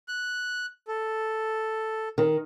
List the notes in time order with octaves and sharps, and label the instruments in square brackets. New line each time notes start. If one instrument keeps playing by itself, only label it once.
[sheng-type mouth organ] F#6
A4
[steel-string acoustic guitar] D#3